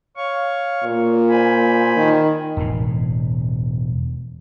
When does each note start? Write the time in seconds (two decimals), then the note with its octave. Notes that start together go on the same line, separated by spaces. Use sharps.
0.17 C#5 F5 C#6
0.84 A#2
1.29 C5 G#5 B5
1.97 D#3
2.57 E1 A2